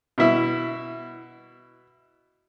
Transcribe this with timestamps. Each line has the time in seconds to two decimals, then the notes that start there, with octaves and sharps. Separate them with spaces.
0.18 B2 E4